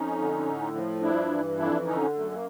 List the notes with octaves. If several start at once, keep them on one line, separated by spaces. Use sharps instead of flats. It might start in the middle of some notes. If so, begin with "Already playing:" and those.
Already playing: F2 C#4 D#4
D3
A2
F3
G2 D4 E4
E3
F2 D4 E4
D3 C#4 D#4
F#2 A3
A#3